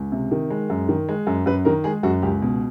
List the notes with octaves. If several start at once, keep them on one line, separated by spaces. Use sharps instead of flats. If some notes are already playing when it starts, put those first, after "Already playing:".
Already playing: C#2
C3
D#3
G#3
F#2
D#3
G#3
F#2
F#2 B4
D#3 A#4
G#3 G#4
F#2 F#4
C#2 G4
B2